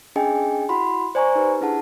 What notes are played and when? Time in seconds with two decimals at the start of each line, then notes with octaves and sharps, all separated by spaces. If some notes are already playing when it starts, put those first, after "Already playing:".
0.16 C#4 D4 G#4 D#5 G5 G#5
0.69 E4 F#4 F#5 B5 C6
1.15 C5 D5 G#5 A#5 C#6
1.35 D#4 G4 B4
1.61 D4 E4 G#4 F#5 A5